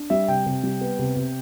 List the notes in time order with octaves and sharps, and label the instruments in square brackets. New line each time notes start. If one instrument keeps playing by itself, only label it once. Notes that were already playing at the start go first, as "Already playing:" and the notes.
Already playing: [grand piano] D4
G3 E5
C3 G5
C3
G3
B3
C3
C3